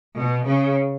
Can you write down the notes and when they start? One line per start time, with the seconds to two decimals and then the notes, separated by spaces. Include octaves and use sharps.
0.17 B2
0.47 C#3